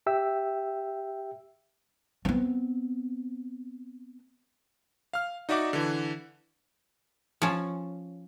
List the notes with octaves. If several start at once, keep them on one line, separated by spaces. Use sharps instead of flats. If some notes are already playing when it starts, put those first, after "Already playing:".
G4 E5 G5 E6
B3 C4
F5 F6
D#4 F#4 D5 E5 F#5 D6
D3 E3
F3 C#4